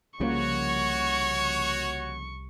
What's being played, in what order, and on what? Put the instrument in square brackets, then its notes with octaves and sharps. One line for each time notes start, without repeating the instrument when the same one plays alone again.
[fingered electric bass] C2 G3 [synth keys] C#3 F3 A#3 [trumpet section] F#4 C#5 [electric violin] C#6